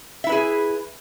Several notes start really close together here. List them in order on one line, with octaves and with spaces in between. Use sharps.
E5 E4 B4 G#4